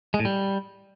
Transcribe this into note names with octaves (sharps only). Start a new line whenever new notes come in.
G#3
A2
G3